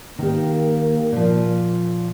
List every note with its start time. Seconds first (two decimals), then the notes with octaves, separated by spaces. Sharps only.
0.19 D#3 A#3 G4
1.12 A#2 F3